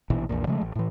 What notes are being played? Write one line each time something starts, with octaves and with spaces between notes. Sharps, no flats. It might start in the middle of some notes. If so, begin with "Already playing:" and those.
A#1 B2 E3
A#1 E2 A#2
C#3 F3 G#3 A3
A1
A2 E3